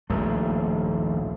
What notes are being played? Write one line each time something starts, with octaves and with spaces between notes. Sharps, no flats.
D#1 A#1 G#2 A3